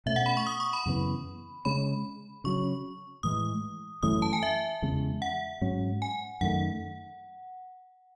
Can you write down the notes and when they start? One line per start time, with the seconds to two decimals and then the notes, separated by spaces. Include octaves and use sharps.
0.06 B2 A3 C#4 E5
0.16 F#5
0.26 B5
0.37 C#6
0.47 D#6
0.60 C#6
0.73 B5
0.86 F#2 C#3 E3 B3
1.65 C#3 G#3 C#4 B5
2.44 C#3 F#3 C#4 C#6
3.23 A2 E3 G#3 D#6
4.03 F#2 E3 A3 C#4 D#6
4.22 A5
4.33 G#5
4.43 E5
4.82 E2 C#3 G#3
5.22 F#5
5.61 G#2 F#3 C#4
6.02 G#5
6.41 F#2 D#3 A3 F#5